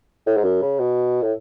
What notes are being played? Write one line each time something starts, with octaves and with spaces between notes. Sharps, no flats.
A2
G#2
F#2
C#3
B2
A2